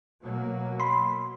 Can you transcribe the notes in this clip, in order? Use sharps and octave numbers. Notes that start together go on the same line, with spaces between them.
B2 F#3 A#3
B5 C6